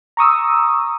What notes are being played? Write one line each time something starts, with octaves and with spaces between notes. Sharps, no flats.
A#5 C#6 D#6 E6